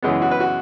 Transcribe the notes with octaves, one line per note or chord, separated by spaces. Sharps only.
F#2 C#3 E3 G#3 B3
F#4
B4
F#4